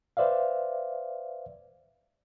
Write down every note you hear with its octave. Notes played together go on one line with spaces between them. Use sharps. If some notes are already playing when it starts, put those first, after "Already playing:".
B4 C5 D5 E5 F5